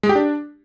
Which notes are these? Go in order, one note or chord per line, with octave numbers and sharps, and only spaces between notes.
G#3
G4
D4